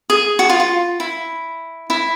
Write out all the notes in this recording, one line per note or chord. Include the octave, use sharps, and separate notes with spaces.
G#4
F#4
F4
F4
E4
E4